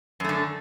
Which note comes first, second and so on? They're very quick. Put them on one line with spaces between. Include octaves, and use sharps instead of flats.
F#2 A3 D3